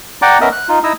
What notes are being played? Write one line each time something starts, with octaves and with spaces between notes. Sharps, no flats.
D5 F#5 G5 A#5 D6
B3 C#4 A#4 D#5 E5 D#6
F#6
D#4 F4
D#4 E4 A#5 D#6 E6